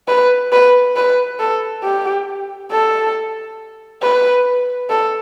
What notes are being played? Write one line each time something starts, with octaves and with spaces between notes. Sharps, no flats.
B4
B4
B4
A4
G4
A4
B4
A4